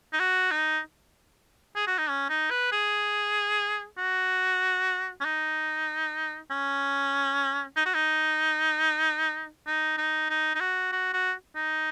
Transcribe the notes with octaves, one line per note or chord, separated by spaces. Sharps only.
D#4
F#4
D#4
G#4
F#4
D#4
C#4
D#4
B4
G#4
F#4
C#4
D#4
C#4
D#4
F#4
D#4
D#4
D#4
D#4
D#4
F#4
F#4
F#4
D#4